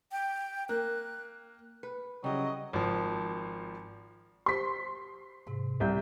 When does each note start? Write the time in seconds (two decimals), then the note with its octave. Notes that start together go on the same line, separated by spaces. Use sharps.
0.12 G5
0.69 A#3 F#6
1.83 B4
2.24 C#3 F#3 G3 E4 D#5
2.73 G#1 F3
4.46 G4 C5 C6 B6
5.47 G#2 C3
5.80 C2 E5 G6